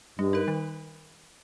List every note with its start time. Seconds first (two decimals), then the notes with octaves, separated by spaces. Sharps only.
0.19 G2 G3
0.33 D#4 A#4
0.48 D#3